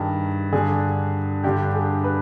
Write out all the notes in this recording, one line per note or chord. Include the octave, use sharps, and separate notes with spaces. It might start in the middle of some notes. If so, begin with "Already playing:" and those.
Already playing: G2 D#3 G#4
G2 D3 G#4
G2 D3 G4
G#4
B4